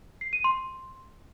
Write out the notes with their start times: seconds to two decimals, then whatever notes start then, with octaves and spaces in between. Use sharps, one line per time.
0.21 C7
0.33 D#7
0.44 C6